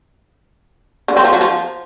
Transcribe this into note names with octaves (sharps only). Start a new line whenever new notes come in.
D3
C4
F3
F#3
F3